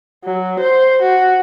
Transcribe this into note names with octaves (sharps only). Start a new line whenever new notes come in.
F#3
C5
F#4